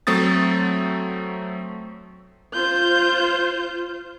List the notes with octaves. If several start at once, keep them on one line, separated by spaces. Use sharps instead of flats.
F#3 A3 C4 D#6 A6
F4 C5 G6